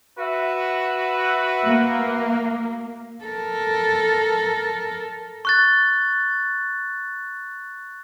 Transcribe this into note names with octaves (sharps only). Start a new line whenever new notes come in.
F#4 B4 E5
A#3
A4 A#4
C#6 F#6 A6